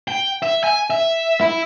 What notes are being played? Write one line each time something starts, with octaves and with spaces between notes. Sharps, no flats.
G5
E5
G#5
E5
E4